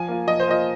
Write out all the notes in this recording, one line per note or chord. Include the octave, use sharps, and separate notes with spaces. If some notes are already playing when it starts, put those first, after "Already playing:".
Already playing: F3 G#5
A#3 F4
F3 D#5
C5
A#3 F4 D#5